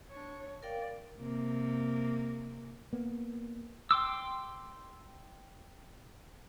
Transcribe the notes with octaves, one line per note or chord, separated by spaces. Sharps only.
D4 C#5
A#4 D5 F5 G5
C3 A#3
A#3 B3
G5 C6 D6 E6